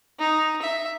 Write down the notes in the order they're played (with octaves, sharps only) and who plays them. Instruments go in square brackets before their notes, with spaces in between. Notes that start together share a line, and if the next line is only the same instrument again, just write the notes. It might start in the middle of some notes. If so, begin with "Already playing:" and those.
[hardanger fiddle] D#4
E5